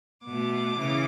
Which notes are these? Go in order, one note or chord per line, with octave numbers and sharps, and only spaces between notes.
B2 A3 D6
C#3 E3